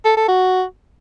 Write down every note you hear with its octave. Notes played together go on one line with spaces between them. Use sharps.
A4
A4
F#4